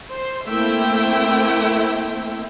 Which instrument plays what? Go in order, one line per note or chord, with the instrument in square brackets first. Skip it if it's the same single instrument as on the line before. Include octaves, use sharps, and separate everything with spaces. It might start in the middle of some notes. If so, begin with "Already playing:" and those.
[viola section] C5
A3 A#3 C4 E4 E5 G5